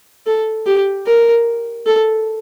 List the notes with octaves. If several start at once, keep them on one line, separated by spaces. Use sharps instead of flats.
A4
G4
A#4
A4